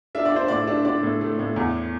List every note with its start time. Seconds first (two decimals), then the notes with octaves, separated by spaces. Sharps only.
0.15 D4 E5
0.25 D5
0.32 D4 C5
0.48 A2 D5
0.67 D4
0.85 D4 D5
1.03 A2
1.21 A3
1.39 A2
1.56 E2